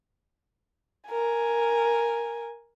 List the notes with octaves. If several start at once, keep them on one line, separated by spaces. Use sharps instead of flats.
A#4 G#5